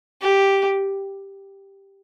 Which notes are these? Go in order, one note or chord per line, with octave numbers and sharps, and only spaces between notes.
G4